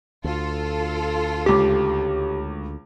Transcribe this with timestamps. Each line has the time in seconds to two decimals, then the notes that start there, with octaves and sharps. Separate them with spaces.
0.24 D2 F4 A4
1.46 C#2 G4 D6